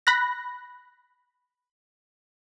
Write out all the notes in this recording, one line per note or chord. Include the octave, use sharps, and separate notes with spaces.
B5 F#6 A#6